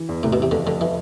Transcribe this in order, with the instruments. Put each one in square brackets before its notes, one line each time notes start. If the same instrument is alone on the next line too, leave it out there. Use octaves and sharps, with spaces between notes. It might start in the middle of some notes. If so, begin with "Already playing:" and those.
Already playing: [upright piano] E3
E2
[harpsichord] A2 [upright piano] C3
[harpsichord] B2
[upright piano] E3
[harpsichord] C3
[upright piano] F2 [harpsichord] D3
[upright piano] F2 [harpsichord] D3
[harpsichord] E3